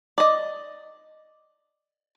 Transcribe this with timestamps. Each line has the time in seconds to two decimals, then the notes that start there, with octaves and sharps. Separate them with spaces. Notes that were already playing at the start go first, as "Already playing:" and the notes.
0.18 D5 D#5